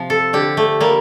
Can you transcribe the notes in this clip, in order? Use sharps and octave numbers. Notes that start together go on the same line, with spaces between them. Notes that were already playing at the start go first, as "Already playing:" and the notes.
Already playing: C3 F3
A4
D3 G4
A3
G3 A#3